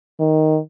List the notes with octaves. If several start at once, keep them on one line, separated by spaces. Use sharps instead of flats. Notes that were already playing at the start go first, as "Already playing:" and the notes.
D#3